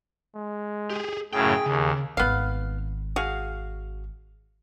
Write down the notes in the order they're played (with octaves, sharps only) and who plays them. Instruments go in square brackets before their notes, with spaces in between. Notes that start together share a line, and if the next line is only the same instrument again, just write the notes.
[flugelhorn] G#3
[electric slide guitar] G4 G#4
[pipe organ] F#2 A2 C#3 [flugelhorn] G#4 [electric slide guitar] G5
[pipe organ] D#2 [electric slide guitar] C#3
[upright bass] G#1 D#3 [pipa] B3 F5
[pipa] F#4 G#4 F5